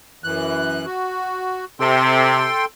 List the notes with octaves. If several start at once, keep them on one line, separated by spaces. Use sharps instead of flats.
F#2 E3 F#6
F#4
C3 A4 G5 C6